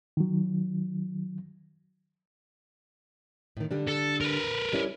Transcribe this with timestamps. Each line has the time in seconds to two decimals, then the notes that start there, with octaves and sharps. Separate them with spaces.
0.17 D#3 F#3
3.57 A2 D#3
3.71 D3 G3 D4
3.88 A4
4.21 A#4 B4
4.73 G3 C#4 E4